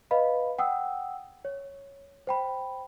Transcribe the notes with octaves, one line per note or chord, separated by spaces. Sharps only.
B4 D#5 F5 B5
F#5 G5 D#6 E6
C#5
C5 G5 B5